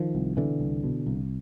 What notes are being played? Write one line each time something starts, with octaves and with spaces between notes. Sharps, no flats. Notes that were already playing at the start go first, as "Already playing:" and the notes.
Already playing: D#3 F3
C2
B2 D3 E3
C2
B2
C2